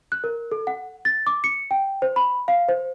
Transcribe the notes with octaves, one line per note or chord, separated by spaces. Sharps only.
F#6
A#4
A4
F#5
A6
D6
C#7
G5
C5
B5
F5
C5